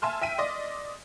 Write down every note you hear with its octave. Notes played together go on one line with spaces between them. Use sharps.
E5 G#5 A5 C6 F6
E5 G5 B6 D#7
D5 D#5 C6